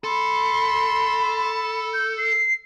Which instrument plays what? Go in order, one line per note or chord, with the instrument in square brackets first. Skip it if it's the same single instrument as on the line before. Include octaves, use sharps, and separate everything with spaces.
[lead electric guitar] A4 [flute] B5 [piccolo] C6
[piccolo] G6
C7